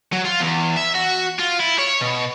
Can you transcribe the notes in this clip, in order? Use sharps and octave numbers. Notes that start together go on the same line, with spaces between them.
F#3
F4
E2
E5
F#4
F4
E4
C#5
B2